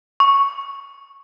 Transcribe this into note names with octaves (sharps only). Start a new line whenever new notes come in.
C#6